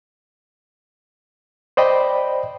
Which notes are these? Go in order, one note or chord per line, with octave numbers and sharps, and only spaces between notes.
C5 D5 D#5 G5 B5